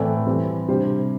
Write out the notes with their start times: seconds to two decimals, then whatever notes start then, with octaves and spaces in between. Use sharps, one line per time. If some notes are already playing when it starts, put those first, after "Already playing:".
Already playing: A2 E3 C4 A4 D5
0.26 E3 G3 C4
0.68 C3 G3 D4 C5